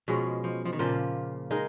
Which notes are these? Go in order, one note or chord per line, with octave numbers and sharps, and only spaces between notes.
B2 F3 G#3 C#4
F3
F3
D#3
A#2 C#3 F3 A#3 F4
G#3 D#4 A#4